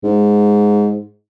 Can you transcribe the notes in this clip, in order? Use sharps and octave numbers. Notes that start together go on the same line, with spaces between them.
G#2